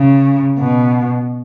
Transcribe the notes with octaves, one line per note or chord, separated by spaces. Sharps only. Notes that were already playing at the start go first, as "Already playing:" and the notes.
Already playing: C#3
B2